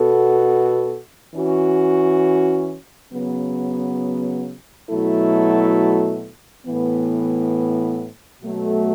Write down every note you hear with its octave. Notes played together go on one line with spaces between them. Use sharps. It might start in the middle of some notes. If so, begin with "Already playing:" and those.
Already playing: B2 B3 F#4 A4
E3 C#4 F#4
C#3 F#3 B3
B2 F#3 A3 E4 A4
A2 E3 B3
B2 F#3 A3 F#4 A4